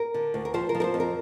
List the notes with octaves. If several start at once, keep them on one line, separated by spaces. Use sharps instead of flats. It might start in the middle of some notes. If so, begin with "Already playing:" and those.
Already playing: A#4
D3
D2
A#4
F3 C5
A#4
F3
A#4
C5
F2
A#4